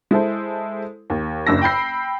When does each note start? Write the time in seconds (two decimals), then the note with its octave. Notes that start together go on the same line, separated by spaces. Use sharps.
0.11 G#3 E4 A4 C5
1.10 D#2
1.47 F#1 D4 E6 A#6
1.62 G5 B5 G6 C7